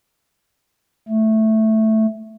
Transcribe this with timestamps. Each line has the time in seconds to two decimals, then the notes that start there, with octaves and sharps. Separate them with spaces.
1.08 A3